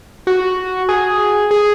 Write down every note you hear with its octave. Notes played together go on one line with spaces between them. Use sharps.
F#4
G#4
G#4